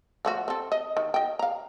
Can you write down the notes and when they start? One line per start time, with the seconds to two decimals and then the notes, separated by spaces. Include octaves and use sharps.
0.25 F3 A3 F#4
0.48 C4 A4
0.72 D#5
0.97 D#3
1.14 D#5 G5
1.39 F5 A#5